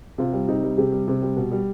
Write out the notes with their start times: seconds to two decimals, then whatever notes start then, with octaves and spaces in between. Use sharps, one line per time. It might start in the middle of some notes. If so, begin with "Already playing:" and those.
0.18 C3 F4
0.33 G3
0.48 C3 D#4
0.63 G3
0.78 C3 G4
0.92 G3
1.08 C3
1.22 G3
1.37 B2
1.52 G3